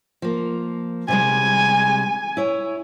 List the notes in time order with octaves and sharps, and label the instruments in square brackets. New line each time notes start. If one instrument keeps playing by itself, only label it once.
[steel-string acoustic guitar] F3 A#3
[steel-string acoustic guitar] C3 G3 G#3 [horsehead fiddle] G#5
[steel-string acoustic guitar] E4 C#5